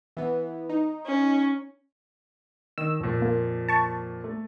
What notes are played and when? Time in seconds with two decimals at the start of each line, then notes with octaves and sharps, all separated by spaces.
0.17 E3 B3
0.69 D#4
1.06 C#4
2.78 D#3 E6
3.00 F2 A#2
3.22 A#3
3.69 A5 C#6
4.24 A3